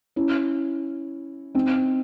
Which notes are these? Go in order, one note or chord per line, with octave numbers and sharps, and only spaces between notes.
C#4 E4
C4 D#4